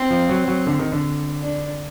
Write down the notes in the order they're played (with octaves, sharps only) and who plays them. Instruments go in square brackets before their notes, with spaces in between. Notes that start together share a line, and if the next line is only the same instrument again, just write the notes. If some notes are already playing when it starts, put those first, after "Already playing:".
Already playing: [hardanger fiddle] C4
[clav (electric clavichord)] F3
F#3
F#3
D3
D#3
D3
[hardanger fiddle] D4